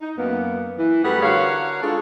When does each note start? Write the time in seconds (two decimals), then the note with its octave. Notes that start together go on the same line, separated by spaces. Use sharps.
0.01 D#4
0.17 F#2 A#3 B3
0.77 E3
1.04 F#2 G3 A3 G#4 B4 F#5
1.22 D3 F#4 A#4 C#5 F5
1.82 G#3 D4 F4 G#4 A4